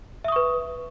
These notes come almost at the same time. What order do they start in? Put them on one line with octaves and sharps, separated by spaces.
E5 D#6 C#6 B4